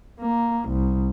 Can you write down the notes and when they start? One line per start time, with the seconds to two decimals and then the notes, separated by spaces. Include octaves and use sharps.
0.20 A#3
0.69 C2